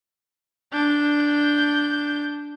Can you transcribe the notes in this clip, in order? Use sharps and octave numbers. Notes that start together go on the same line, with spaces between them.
D4 G6